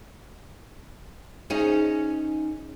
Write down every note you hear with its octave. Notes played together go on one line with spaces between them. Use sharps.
C#4 D#4 G#4